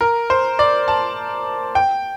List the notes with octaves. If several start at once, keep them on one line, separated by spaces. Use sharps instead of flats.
A#4
C5
D5
A5
G5